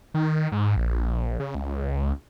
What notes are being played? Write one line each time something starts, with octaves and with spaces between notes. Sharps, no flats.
D#3
G#2
A#1
C#3
C#2